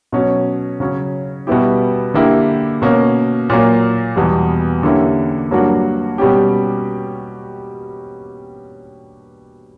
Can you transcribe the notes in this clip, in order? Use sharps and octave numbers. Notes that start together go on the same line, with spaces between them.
B2 F#3 C#4
C#3 F#3 C#4
B2 G3 B3 E4 G4
D3 A#3 E4 G4
B2 A#3 C#4
A#2 F#3 A#3
E2 B2 G3
D3 A#3 C#4 E4 G4
G2 F#3 A#3 D4 F#4
B2 G3 C#4 G4